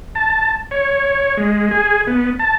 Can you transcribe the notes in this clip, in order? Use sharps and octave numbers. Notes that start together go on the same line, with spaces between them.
A5
C#5
G#3
G#4
B3
A5